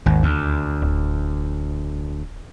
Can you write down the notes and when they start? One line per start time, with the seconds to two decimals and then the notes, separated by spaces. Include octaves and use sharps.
0.06 G#1 D#2
0.23 D2
0.82 D1